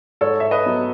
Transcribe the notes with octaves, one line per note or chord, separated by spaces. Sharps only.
G#2 A4 C#5
E5
B4 D#5
F#3 B3